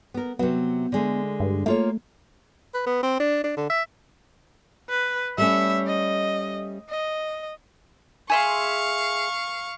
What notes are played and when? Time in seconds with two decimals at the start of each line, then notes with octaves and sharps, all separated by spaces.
0.14 B3 A#4
0.39 C3 F#3 B3
0.92 D3 G#3 A3
1.40 G2
1.66 A3 A#3 F4 C#5
2.74 B4
2.87 B3
3.03 C4
3.20 D4
3.44 D4
3.57 D3
3.70 E5
4.90 B4
5.38 G3 A3 C#4 E5
5.87 D#5
6.89 D#5
8.30 G#4 E5 F5 C6 C#6